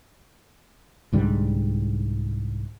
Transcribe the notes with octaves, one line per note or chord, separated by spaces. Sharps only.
C2 G#2 D3 G3